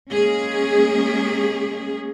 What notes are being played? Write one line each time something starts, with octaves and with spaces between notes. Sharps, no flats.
G#3 A#3 C#4 G#4